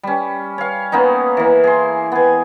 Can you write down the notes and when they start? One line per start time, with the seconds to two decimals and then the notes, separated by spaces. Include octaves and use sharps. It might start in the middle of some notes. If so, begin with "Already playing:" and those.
0.03 G3 C#4
0.58 C#5 F5
0.92 A#3 B3 C#4 D#4
1.37 E3 A#3
1.64 G#4 C6
2.12 B3 G#5